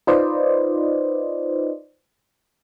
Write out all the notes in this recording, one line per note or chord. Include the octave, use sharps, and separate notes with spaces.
D#4 F4 B4 C5 D5 D#5